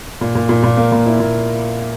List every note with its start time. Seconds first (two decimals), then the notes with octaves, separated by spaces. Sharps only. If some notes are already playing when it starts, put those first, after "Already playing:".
0.21 A#2
0.35 A#2
0.49 A#2
0.63 A#2
0.77 A#3
0.92 A#2
1.06 E4
1.20 A#2